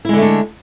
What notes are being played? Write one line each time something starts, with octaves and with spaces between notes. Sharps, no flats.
D3 G#3 A3 D4 E4